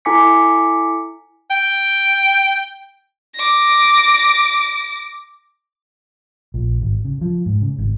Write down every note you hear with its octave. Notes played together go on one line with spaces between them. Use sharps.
E4 A4 G#5 D6 B6 C#7
G5
D6 A#6
A#1
G#1
C#3
F3
G#2
C#3
G#1